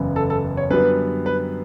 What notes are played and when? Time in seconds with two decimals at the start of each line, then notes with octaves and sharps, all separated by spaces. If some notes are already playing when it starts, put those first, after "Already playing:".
Already playing: F#1 E2 C#3 F#3 B3
0.16 A4
0.30 A4
0.57 C#5
0.70 F#2 D3 G3 B3 B4
1.26 B4